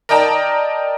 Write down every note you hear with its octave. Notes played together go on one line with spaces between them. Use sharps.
A#4 D5 D#5 G5 A5 A#5